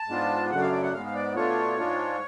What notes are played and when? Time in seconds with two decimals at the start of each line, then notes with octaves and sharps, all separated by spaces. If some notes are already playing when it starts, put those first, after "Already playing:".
Already playing: A5
0.08 G#2 G#3 B3 D4 F4
0.50 F#2 C#3 F#3 A3 D4 F#5
0.61 F5
0.72 D5
0.83 F#5
0.93 G#2 G#3 B3 F5
1.06 F5
1.14 D5
1.35 B2 A3 D4 F4 C#5
1.78 G#2 G#3 D4 F4